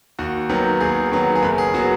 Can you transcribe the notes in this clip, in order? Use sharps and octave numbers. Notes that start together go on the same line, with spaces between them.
D#2 F#4
D#3 F#3 B3
D#2 G#4
D#3 F#3 B3
G#4
F#1 B4
G#4
F#3 B3 F#4